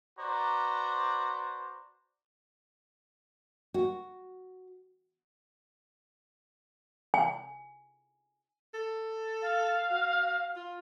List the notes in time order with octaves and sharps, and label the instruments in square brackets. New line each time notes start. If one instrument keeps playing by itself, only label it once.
[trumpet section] F#4 B4 C5 D5 A#5
[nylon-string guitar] F#4
[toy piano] G#5
[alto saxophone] A4
[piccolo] F5
[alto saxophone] F#4
F4